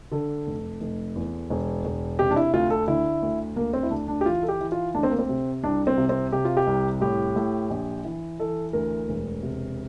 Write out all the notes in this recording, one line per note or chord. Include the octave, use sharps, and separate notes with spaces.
D3 A4
F1
F1
E2
E1
E1
C3 G4
D4
E4
D2 F4
A4
D3 E4
D2
D2 A#3
C4
E4
D2 D4
D4
G4
E3 F4
A4
G4
E3
F4
D2 D4
C4
A#3
C4
C3
C2 D4
C4
C3
C4
C3 G4
F4
G4
C2
A2 G4
A2
A#1
E3
E3 A4
D2 A#4
E1
C3